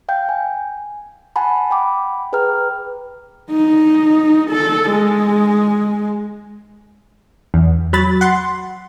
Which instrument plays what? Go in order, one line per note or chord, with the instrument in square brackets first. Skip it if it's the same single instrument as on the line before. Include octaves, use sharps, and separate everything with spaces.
[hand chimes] F5 G5 G6
G#5
F#5 G#5 A5 B5
G5 B5 D6
G#4 B4 G5 A#5 F6
[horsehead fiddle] D#4
A4
G#3
[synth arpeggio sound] E2
F#3 B5 A6
F#5 C6